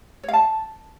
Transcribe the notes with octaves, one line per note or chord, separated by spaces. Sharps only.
C#5
F5
A5